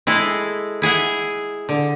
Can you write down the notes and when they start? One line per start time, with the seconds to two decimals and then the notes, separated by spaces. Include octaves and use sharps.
0.07 G#3 E4 G#4 A4
0.82 E4 G#4 E5 F#5
1.69 D3